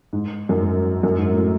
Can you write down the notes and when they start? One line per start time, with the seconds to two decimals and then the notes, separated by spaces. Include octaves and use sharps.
0.13 G#2
0.49 F#2
0.58 G#2
1.03 F#2
1.18 G#2
1.34 A2